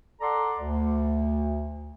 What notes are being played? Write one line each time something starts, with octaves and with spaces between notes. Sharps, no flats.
A4 D5 F#5 A#5 C6
D2